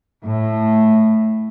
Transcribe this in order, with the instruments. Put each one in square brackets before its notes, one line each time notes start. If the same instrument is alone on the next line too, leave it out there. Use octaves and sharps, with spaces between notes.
[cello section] A2